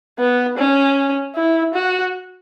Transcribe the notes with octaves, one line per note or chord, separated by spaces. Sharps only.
B3
C#4
E4
F#4